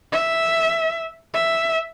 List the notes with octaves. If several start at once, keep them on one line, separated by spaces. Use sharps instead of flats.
E5
E5